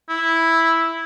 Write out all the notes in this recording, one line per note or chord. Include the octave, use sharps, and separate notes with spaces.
E4